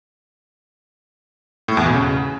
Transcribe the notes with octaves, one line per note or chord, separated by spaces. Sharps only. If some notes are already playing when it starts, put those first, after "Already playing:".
A2
E2
B2
C#3